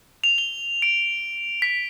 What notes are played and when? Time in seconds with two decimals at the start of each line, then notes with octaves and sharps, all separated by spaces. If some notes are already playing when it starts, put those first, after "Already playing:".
0.24 F7
0.38 G7
0.82 D7
1.62 B6